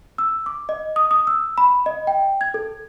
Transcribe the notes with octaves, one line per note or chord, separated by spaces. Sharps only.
E6
D6
D#5
D#6
D#6
E6
B5
D#5
G5
G#6
A4